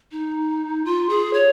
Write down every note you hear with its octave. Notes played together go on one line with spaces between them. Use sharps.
D#4
F4
G#4
C#5